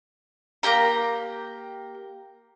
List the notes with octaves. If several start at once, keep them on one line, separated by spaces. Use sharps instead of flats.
A#3 D4 G4 A#5